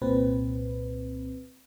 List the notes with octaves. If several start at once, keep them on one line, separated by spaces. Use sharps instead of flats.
C2 A#2 C4 B4